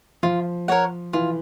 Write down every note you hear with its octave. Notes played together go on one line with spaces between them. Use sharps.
F3 F4
A#4 C#5 F#5
E3 F4